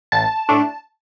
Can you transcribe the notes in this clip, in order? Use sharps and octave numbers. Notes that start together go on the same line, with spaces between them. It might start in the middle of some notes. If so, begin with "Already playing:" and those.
A1 A5
A2 A3 D4